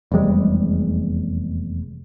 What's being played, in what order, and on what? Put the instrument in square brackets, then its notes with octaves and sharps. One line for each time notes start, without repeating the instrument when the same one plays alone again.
[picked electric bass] F1 E2 G3 G#3